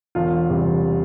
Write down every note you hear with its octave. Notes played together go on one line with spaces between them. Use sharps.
E1 F4
E2 C3 G3